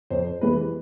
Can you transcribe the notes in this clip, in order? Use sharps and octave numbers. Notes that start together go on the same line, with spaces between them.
F2 C5
C3 E3 G#3 B4